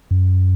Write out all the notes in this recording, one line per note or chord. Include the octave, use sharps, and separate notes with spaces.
F#2